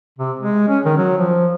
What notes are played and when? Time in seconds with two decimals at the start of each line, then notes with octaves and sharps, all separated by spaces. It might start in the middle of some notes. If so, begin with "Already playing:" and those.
0.18 C3
0.39 G#3
0.68 C#4
0.85 D#3
0.97 F#3
1.18 F3